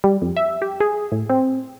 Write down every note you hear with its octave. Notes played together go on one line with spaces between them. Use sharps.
G3
F2
E5
G4
G#4
A2
C4